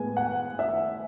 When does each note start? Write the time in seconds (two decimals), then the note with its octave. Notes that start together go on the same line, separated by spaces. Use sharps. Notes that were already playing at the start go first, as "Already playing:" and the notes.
Already playing: A2 G#3 B3 G#5
0.17 F#5
0.59 E5